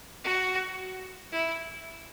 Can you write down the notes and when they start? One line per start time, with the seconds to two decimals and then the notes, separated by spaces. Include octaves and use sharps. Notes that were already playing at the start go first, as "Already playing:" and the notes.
0.24 F#4
1.33 E4